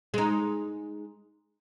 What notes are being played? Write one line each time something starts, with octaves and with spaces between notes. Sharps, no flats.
G#3 D#4